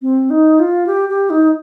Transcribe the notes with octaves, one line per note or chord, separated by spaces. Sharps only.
C4
D#4
F4
G4
G4
D#4